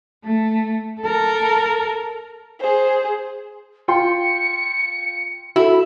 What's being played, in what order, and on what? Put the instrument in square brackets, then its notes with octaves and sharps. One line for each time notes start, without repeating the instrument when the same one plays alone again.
[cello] A3
A4 A#4
[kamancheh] G#4 C5
[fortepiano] F4 G5 C6 [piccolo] C#7
[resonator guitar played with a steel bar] E4 [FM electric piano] F#4 A4